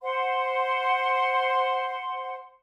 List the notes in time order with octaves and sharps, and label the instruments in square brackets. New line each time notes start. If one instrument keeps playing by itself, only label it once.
[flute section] C5 F#5 C6